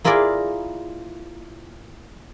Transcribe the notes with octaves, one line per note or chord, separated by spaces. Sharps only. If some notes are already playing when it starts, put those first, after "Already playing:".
A#3 E4 F4 G#4 A#4 D5